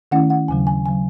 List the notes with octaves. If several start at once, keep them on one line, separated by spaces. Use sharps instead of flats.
D#3 A3 C#4 E4 F#5
F#5
D#2 C#3 F#3 G#5
G#5
C#3 F#3 G#5